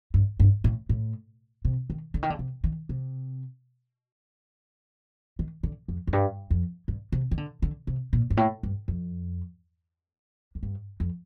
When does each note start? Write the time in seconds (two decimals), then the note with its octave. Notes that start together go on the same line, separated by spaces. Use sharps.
0.14 G2
0.40 G2
0.64 A2
0.89 A2
1.65 C3
1.90 D#3
2.14 D3
2.23 D#3
2.30 D3
2.39 C3
2.64 D#3
2.89 C3
5.39 D#3
5.63 D3
5.88 F2
6.07 F2
6.13 G2
6.50 F2
6.88 G2
7.12 C3
7.31 D#3
7.38 D3
7.62 D3
7.87 C3
8.13 A#2
8.30 G2
8.37 A2
8.63 G2
8.88 F2
10.55 F2
10.63 G2
11.00 F2